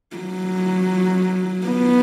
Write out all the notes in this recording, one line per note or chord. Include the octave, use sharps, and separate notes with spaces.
F#3
B3